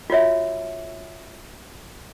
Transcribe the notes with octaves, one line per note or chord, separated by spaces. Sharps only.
F4 F#4 C#5 E5